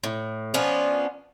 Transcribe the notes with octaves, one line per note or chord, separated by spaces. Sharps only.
A2
F3 B3 C#4 D4